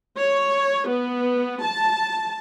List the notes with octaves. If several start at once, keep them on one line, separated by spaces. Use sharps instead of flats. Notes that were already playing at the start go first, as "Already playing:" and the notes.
C#5
B3
A5